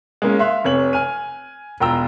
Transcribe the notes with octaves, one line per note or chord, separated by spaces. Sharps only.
G#3 A#3 C#4
E5 F5 C6 F#6
F1 C3 C#5 F#7
G#5 F6 D#7
E1 F4 G5 A#5 E6